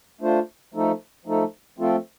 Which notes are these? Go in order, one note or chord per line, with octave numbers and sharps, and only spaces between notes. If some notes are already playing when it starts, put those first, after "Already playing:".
A3 D4 F4 C5
F3 A3 D#4 A4
F3 A3 D#4 A4
F3 A3 C4 F4 A4